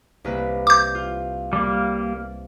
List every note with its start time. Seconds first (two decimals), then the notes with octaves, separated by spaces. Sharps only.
0.24 C2 A#3 B4
0.67 D6 G6
0.95 F4
1.53 G3 A#3